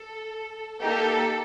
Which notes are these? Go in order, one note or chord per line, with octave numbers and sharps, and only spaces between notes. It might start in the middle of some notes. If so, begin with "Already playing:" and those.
Already playing: A4
A#3 D#4 G4 A4